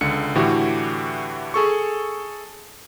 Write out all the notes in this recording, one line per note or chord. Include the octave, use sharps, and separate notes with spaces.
C#2 D3 C#7
A2 D3 E3 F#4 G4
G#4 A4 C#6